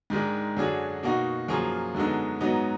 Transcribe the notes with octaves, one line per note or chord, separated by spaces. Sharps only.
G#2 D#3 G#3 D4
F#2 D3 F#3 D4 G#4
B2 A#3 D#4 F#4
F#2 F3 A#3 F4 G#4
F#2 D3 G#3 B3 D#4
G#2 F#3 B3 D#4